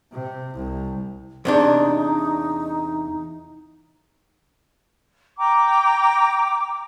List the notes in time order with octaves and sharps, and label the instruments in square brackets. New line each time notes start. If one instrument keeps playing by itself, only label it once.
[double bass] C3
C2
[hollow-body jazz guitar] E2 C3 D4 [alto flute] D#4
[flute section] G5 A#5 D6